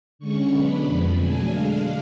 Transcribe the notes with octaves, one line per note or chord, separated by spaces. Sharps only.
D3 G#3 C#4 C#6
B2 F#3 B3 D4 B5
F2 D3 F3 G#3 B5
B2 F#3 A3 D4 G#5
D3 G#3 D4 F5